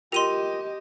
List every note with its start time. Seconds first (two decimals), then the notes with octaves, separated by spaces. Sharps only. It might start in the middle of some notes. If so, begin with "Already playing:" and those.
0.12 F4 G4 A#4 D#5 G5 C6 D#7 F7